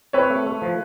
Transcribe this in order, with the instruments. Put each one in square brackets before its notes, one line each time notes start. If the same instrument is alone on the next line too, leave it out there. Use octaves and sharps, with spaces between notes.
[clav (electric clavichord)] C4 [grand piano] B4 C#5
[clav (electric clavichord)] A3
A3
F3